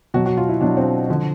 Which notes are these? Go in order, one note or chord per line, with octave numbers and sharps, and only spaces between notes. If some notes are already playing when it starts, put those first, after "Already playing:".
B2 F#3 F#4
F#4
F4
E4
B2 F#3 D4
C4
D3 F3